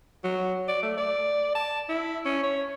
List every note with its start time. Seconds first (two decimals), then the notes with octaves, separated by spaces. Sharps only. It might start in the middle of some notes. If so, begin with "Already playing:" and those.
0.24 F#3
0.69 D5
0.83 A3
0.98 D5
1.55 A5
1.89 E4
2.25 C#4
2.43 C#5